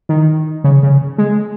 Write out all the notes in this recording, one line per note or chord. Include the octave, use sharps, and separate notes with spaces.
D#3
C#3
C#3
G#3